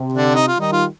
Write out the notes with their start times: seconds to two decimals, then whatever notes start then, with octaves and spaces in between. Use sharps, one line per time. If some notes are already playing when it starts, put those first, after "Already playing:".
Already playing: C3
0.13 D3 D4
0.35 D#4
0.47 F4
0.57 D#3 G3 D#4
0.72 F4